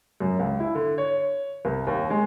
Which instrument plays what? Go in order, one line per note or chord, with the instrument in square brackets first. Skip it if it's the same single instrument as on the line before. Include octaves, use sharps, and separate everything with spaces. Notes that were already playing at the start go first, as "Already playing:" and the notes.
[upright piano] F#2
C#2
E4
D3
C#5
C2
D#2
G#3